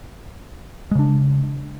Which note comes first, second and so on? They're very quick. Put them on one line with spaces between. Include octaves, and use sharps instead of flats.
G#3 C#3 D4